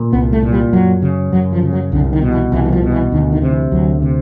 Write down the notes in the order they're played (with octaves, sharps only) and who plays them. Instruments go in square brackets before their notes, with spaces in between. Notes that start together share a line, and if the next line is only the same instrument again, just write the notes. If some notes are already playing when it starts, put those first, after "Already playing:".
Already playing: [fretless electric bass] A#2
C2 B3
A3
A#2
G3
F#2 F#3
C#3
F#2 F#3
F3
C#3
F#3
C2 D3
D#3
B2
E3
C2 E3
E3
F3
B2
E3
D2 D#3
D#3
C3
E3
D2 F#3
C3